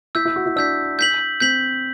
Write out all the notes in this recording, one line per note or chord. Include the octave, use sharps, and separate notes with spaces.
E4 E6 G6 B6
E4
F#4
E4
D4 E6 G6 B6
G6 B6 F#7
C4 G6 B6 F#7